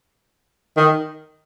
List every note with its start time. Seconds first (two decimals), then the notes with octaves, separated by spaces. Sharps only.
0.77 D#3